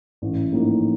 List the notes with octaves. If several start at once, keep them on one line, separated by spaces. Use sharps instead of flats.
A1
A2 F3 A#3 D#4